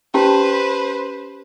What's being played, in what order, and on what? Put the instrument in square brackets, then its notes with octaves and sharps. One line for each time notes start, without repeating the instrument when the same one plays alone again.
[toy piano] C#4 G4 A5 [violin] B4 C5